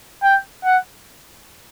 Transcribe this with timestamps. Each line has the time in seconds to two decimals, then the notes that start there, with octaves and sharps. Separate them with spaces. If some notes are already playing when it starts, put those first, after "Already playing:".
0.23 G5
0.64 F#5